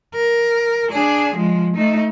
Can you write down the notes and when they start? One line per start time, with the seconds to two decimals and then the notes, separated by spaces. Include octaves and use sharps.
0.15 A#4
0.91 D4 G#4
1.35 F3 G#3
1.76 A3 D#4